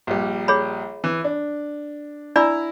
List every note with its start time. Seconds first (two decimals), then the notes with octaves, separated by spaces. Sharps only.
0.07 A#1 G3
0.48 G#4 C#5 B5
1.04 E3
1.24 D4
2.36 D4 E4 D5 A#5 B5 E6